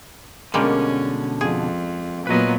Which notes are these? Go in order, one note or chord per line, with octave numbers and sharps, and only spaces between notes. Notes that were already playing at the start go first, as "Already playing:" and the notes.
B2 D3 G3 G#3 A#3 C#4
F2 G#4
A#2 F#3 B3 B4 D#5